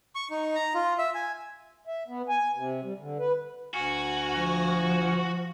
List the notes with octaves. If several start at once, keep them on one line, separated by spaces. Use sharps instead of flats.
C#6
D#4
A#5
F4
E5
G#5
E5
B3
G#5
C3
G3
D3
B4
D2 F#4 G#5 F6
F3